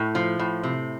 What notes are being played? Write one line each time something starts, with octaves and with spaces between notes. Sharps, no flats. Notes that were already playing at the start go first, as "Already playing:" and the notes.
Already playing: A2
F3
A2
C3